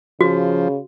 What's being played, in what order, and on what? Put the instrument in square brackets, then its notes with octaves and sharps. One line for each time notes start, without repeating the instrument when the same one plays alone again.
[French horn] C#3 [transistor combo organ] F3 [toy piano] F#4